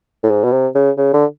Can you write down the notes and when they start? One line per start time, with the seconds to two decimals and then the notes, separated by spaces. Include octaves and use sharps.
0.23 A2
0.31 G#2
0.44 B2
0.52 C3
0.75 C#3
0.98 C#3
1.14 D3